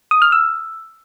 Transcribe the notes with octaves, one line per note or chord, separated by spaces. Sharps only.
D#6
F6
E6